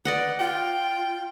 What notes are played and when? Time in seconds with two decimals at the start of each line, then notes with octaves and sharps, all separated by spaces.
0.05 B4 D5 D#5 F#5
0.39 F4 G5